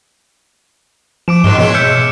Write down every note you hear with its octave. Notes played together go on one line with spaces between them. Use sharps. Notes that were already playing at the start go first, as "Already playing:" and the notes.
F3 D6 D7 E7
G#2 B2 D#3 C4 F#6 E7 G7
B2 E3 G#3 C#4
E5 F6 G6 C#7